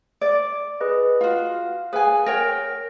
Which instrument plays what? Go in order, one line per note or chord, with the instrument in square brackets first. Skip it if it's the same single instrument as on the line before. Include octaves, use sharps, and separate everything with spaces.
[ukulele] D5
[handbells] G#4 B4 D#5
[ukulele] F4 F#4 [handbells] F5
[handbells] G#4 F5 [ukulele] B4 G#5
[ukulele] A#4 C#5 G5 [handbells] A#6